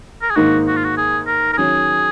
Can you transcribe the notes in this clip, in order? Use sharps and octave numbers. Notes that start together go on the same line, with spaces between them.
A#4
G#4
G#2 D#3 A#3 D#4 F#4
F#4
F4
F#4
G#4
A#4
A#4
D#3 F#3 C#4 G#4